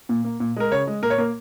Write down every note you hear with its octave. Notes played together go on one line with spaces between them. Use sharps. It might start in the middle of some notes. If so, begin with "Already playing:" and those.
A#2
A#3
A#2
G#3 A#4
C#3 C#5
G#3
A#2 A#4
C#5
A#3 A#4